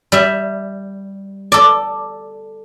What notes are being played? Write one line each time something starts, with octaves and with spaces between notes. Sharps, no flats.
G3 E5
A4 D5